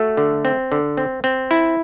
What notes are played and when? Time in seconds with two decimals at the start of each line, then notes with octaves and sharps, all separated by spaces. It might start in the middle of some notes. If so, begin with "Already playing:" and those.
Already playing: A3 F#4
0.17 D3
0.45 C4
0.72 D3
0.97 C4
1.24 C4
1.51 E4